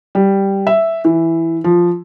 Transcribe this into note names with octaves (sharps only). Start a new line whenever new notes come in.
G3
E5
E3
F3